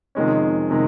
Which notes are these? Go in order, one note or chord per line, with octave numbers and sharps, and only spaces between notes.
F2 C3 D#3 G#3 C#4
C3 D#3 G#3